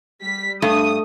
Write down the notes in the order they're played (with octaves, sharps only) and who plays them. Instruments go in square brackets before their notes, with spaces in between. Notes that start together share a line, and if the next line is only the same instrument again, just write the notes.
[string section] G3 B6
[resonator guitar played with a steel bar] G2 [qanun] A3 [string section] D#6